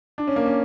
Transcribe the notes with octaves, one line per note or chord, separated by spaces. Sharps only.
D4
C#4
A#3
C#4